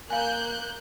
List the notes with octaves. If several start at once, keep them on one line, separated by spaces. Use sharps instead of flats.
A#3 F5 G#5 F#6 G6